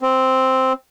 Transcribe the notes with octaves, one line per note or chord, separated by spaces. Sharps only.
C4